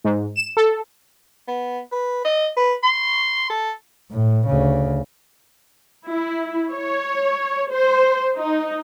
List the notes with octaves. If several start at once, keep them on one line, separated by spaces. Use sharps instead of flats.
G#2
E7
A4
B3
B4
D#5
B4
C6
A4
A2
D2 C#3
E4
C#5
C5
D#4